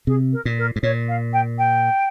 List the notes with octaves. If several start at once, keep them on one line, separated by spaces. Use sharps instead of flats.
C3 G#4
A#4
A#2
A#4
G#2
A#2 C#5
F5
G5
G5